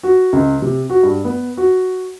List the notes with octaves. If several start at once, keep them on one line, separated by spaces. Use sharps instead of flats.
F#4
C#2
C3
F#4
G2
B3
F#4